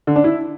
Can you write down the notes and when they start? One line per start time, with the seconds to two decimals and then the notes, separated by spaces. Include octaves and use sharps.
0.07 D3
0.16 D4
0.24 E4